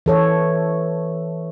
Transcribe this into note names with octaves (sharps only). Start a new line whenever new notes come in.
E3 A4 C#5